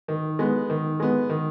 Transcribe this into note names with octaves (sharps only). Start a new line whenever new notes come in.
D#3
G#3 B3
D#3
G#3 B3
D#3